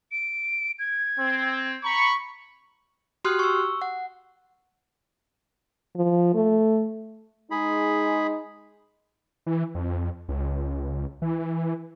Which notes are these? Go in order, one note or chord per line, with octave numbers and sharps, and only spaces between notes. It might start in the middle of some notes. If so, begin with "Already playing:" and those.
D7
G#6
C4
A#5 B5 C#6
F#4 G4 C6 D#6 F6 F#6
C#6 E6
F#5
F3
A3
G#3 D#4 G#4 B5
E3
F2
C#2
E3